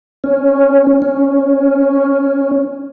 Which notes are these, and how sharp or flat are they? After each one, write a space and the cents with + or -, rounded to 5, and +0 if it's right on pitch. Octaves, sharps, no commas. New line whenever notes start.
C#4 -5
C#4 +0